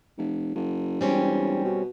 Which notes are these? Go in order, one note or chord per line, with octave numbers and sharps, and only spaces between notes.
F1
F#1
E1 G3 C4 C#4
B2